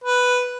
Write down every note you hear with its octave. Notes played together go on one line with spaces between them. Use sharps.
B4